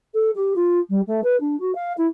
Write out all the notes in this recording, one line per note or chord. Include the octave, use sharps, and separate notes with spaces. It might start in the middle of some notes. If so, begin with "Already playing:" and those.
A4
G4
F4
G3
A3
B4
D4
F#4
F5
E4